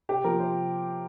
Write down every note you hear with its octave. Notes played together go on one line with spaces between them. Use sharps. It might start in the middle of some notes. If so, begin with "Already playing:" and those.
C3 G4
F3 A#3 A#4
C3 C5